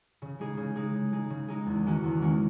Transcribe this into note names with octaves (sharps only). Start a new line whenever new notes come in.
C#3
G#3 D#4 G#4
C#3
G#3 D#4 G#4
C#3
G#3 D#4 G#4
C#3
G#3 D#4 G#4
E2
D#3 G#3 C#4 F#4
E2
D#3 G#3 C#4 F#4